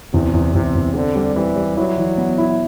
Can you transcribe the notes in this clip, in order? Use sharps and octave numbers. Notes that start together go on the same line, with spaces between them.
E2 C3
E2
E2 C3
E2
D3 C4
G3
E3 G3
G3
F#3 E4
E3
B3
E4